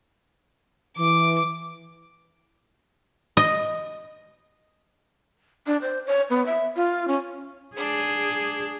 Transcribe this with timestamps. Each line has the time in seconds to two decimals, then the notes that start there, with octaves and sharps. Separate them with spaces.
0.98 E3 D6
3.37 D#5
5.67 D4
5.82 C5
6.07 C#5
6.30 B3
6.46 E5
6.76 F4
7.08 C#4
7.77 D4 G#4 D6